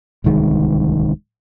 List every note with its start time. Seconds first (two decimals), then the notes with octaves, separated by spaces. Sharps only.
0.24 D1 C2 D#3 G#3